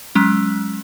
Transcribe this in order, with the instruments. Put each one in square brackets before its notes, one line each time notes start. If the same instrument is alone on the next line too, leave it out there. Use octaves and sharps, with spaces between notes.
[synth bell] F#3 G#3 C#4